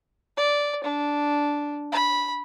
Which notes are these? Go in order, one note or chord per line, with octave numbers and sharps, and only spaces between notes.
D5
D4
B5